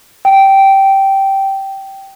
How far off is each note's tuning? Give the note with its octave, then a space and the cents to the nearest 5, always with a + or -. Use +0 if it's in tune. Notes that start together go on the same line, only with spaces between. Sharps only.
G5 -10